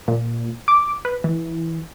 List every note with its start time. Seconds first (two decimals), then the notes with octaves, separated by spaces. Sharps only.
0.08 A#2
0.68 D6
1.05 B4
1.24 E3